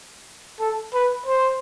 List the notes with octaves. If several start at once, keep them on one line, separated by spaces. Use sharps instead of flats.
A4
B4
C5